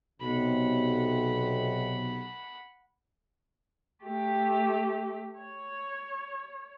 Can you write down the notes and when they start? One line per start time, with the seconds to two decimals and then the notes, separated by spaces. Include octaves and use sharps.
0.20 B1 C3 F#5 B5
4.04 A3 G4
5.39 C#5